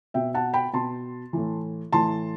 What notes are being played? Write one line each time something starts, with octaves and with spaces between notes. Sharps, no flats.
B2 E5 G5
F#5 A5
G5 B5
B2 A5 C6
A2 E3
A2 E3 A5 C6